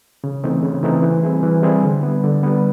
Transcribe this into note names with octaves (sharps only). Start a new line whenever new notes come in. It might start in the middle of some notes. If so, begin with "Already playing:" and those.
C#3
E3 A3 C4 D#4
C#3
E3 A3 C4 D#4
E3
G3 C4 E4 G#4
E3
G3 C4 E4 G#4
D3
G3 B3
D3
G3 B3